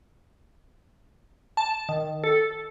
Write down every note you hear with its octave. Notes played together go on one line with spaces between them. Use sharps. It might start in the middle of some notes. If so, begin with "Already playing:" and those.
A5
D#3
A4